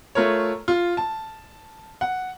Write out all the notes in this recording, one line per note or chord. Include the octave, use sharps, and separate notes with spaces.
A3 F4 A#4 C#5
F4
A5
F#5